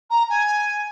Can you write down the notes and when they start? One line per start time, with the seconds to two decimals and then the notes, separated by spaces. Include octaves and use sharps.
0.10 A#5
0.29 G#5